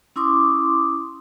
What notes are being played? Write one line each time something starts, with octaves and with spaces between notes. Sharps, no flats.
C#4 E4 C6 D6 D#6